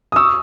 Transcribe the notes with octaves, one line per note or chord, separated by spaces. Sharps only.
D#6
C#6 E6